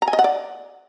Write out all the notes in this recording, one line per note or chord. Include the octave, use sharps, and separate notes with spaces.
A#5
G#5
D#5
F#5
D5